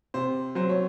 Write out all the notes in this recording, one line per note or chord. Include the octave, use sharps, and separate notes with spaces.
C3 C5
F#3 C5
C#5